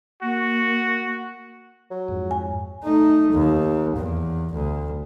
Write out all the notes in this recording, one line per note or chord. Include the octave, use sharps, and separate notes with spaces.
A#3 F#4
F#3
F2 G#2
G#5
A3 D#4
D#2
E2
D2